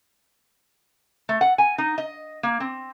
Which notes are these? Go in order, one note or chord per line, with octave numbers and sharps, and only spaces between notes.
A3
F#5
G#5
D#4
D#5
A#3
C4